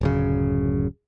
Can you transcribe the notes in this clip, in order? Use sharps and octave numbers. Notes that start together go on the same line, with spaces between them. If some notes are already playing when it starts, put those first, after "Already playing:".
D1 F#2 C#3